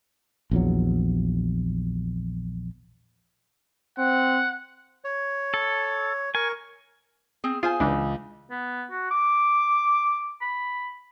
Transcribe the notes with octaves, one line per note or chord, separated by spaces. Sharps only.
A#1 E2 F#3
C4 F#5
C#5
A4
A#4 G#5 C#6
C4 G#4
F4 G#4 C5 G#5
C#2 E3 D4
B3
F#4
D6
B5